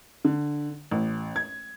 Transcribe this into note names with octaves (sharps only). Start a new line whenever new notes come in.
D3
A1
G#6